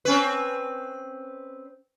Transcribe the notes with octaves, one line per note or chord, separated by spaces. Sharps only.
C4 C#4 B4